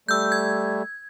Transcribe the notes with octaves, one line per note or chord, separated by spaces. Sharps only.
G3 A3 E6 G6
G#6